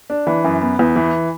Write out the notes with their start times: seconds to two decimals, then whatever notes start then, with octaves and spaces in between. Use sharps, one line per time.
0.10 D4
0.27 E3
0.44 F#2
0.61 B3
0.79 E2
0.96 E3